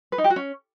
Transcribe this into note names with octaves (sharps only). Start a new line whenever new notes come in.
B4
D#4
G4
F#4
C#4